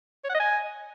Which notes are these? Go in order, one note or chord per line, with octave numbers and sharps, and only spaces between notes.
C#5
F#5
D#5
G#5